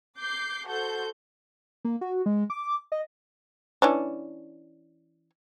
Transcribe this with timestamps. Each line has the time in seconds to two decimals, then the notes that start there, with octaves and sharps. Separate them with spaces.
0.19 D6 G6 C7
0.65 F#4 A4 C5 G6
1.85 A#3
2.01 F#4
2.26 G#3
2.50 D6
2.92 D#5
3.82 E3 C#4 D4